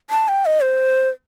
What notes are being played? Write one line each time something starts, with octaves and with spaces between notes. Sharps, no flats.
A5
G5
D#5
C5